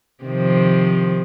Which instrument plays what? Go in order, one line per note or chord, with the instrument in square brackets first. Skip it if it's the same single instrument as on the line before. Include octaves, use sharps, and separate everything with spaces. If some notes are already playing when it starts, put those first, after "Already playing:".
[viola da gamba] C3 D#3 F3